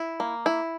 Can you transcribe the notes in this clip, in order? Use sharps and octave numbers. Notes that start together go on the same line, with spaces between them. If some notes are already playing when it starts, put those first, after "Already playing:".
Already playing: E4
A#3
E4